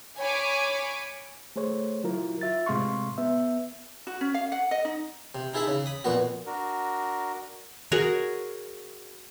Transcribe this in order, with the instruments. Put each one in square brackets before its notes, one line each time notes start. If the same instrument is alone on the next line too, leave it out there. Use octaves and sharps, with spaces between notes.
[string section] C#5 G#5 B5 C#6 D6
[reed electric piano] A3 G#4 C5 C#5
F#3 E4 F4 A#4
F4 E5 A6
A2 C3 G#3 F5 C6 C#6
B3 E5
[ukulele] F#4
C#4
F5
F#5
D#5
D#4
[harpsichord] C3
D#4 E4 G#4 A4 E5 B5
C#3
B5 D#6
F2 A#2 B3 F#4
[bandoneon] D4 F#4 A#4
[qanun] F#4 G#4 A#4 C#5